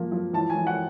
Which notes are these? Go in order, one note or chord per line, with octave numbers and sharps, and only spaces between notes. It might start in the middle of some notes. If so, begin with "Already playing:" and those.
Already playing: F3 A#3
F3
E3 A5
G#5
E3
F#5